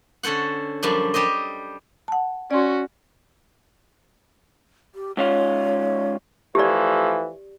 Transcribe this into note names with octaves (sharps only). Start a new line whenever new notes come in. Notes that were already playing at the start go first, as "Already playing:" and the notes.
D3 C#4 A4 C5 F#5
F#2 F3 G3 D4
G3 G4 C5 D#5
F#5 A5
C#4 F#4 D5 C6
G4
G#2 C#4 F4 C#5
E3 F3 A3 G4 D5